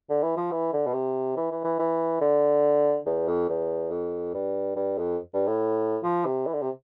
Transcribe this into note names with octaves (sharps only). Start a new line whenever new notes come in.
D3
E3
F3
E3
D3
B2
C3
E3
E3
E3
E3
D3
E2
F2
E2
F2
G2
G2
F2
G2
A2
F3
C3
E3
D3
C3